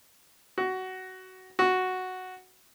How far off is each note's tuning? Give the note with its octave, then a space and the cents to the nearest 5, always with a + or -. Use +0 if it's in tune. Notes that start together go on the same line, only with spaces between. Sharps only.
F#4 +15
F#4 +0